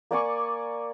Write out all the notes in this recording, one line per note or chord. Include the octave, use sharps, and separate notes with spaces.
A#3 D5 G#5 C#6